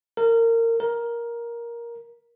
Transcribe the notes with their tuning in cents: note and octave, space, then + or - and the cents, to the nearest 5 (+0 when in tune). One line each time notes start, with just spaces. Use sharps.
A#4 -25
A#4 +10